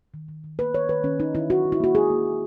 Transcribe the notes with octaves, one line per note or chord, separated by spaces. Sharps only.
D#3
D#3
D#3
A#3 B4
D#3 C#5
D#3 B4
D#3 C#4
D#3 D#4
D#3 E4
D#3 F#4
D#3
E4
A#3 F#4
A#3 G#4
A#3
A#3